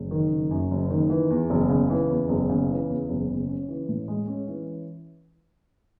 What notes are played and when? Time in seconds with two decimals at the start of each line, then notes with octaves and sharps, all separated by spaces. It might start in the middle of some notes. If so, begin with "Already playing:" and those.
Already playing: F#1
0.11 D#3
0.31 F#1
0.51 F#2
0.71 F#1
0.90 D#3
1.10 E3
1.30 E2
1.50 F#1
1.69 C#3
1.90 E3
2.10 E2
2.29 F#1
2.49 C#3
2.69 E3
2.89 E2
3.09 F#1
3.28 C#3
3.49 C#4
3.69 E3
3.89 A2
4.08 G#3
4.28 C#4
4.48 E3